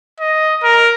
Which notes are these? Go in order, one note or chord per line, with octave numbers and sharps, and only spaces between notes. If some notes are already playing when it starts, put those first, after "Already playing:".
D#5
A#4